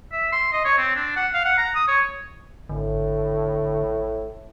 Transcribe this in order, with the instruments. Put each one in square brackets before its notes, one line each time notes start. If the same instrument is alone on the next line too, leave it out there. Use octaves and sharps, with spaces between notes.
[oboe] E5
C6
D#5
C#5
C4
D4
F#5
F5
F#5
A#5
D#6
C#5
[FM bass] G#1 [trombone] A2 [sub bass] D3